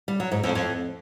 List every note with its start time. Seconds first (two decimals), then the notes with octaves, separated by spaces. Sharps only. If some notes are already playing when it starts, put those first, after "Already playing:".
0.08 G3
0.20 F#3
0.32 G#2
0.43 F2
0.55 F2